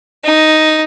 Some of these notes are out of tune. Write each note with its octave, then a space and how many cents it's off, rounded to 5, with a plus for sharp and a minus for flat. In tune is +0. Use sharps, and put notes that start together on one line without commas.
D#4 +5